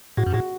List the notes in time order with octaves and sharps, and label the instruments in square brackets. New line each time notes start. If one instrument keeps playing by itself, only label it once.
[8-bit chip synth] A2 [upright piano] F#4
[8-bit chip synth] F#2
[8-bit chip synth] A2 [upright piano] F#4